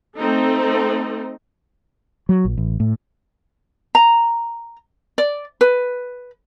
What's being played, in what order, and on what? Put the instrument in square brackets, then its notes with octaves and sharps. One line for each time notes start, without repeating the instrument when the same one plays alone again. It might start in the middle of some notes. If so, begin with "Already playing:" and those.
[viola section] A3 C4 D#4 A4
[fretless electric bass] F#3
A#1
A1
A2
[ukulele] A#5
D5
B4